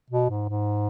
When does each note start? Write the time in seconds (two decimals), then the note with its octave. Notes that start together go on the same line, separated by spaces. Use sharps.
0.10 B2
0.30 G#2
0.49 G#2